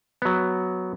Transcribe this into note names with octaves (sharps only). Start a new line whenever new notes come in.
F#3 B3